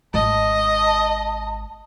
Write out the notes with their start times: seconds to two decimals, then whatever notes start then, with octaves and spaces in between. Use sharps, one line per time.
0.14 G#1 D#5 A5